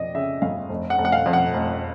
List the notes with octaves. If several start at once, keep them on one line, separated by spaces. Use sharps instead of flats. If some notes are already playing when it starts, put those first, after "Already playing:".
Already playing: F2 D5 D#5
C#3 E5
G1 F5
F1
F#5
F1
F#5
F5
F2
F#5
F1